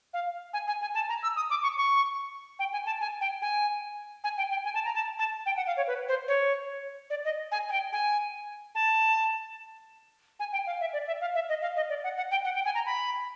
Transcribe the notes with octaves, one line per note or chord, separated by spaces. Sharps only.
F5
G#5
G#5
G#5
A5
A#5
E6
D#6
D6
C#6
C#6
G5
G#5
A5
G#5
G5
G#5
G#5
G5
G5
G#5
A5
A#5
A5
A5
G5
F#5
F5
C#5
B4
C5
C#5
D5
D#5
G#5
G#5
G5
G#5
A5
G#5
G5
F5
E5
D5
E5
F5
E5
D#5
F5
D#5
D5
F#5
F#5
G5
F#5
G5
G#5
A#5
B5